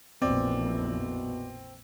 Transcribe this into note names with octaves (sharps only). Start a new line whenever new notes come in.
A#1 F2 B2 E3 C4 D5